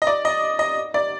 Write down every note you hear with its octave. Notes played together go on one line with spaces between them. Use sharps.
D#5
D5
D#5
D#5
D5